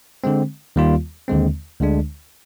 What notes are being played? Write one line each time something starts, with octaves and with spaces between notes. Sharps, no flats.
D3 G#3 C4
D#2 D#3 G3 A#3 F4
D#2 D3 G#3 C4
D2 D3 G#3 D4